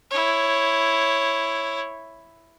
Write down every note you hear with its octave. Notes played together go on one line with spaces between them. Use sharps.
E4 C#5